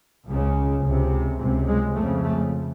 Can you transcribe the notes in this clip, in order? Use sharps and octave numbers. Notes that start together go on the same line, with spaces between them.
C#2 C#3
C#2 C3
C#2 C3
G#3
F2 C#3 A3
A3